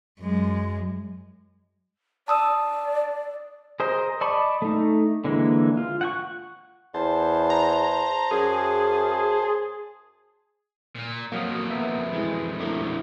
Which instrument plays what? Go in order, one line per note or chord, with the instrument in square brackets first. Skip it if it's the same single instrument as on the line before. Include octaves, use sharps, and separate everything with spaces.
[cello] F#2 G#3
[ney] D5 [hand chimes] A5 D#6 E6
[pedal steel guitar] G#4 A#4 C5 D#5
D5 D#5 A5 B5 C#6
A3 D#4
D3 E3 G#3 A#3
F4
F#5 G5 C#6
[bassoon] E2 [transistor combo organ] C5 A5
[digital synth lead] A#5
[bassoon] F#2 [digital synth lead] G#4
[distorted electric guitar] A#2 A#3
[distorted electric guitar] F2 B2 [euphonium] F#3 [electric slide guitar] A#3 [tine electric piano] F5 D#6
[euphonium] B3 [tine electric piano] E5
[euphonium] E3 [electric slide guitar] G#3
[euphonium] A3 [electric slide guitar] D4 E4 A#4